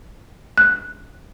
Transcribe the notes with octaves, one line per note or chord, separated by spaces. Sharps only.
F#6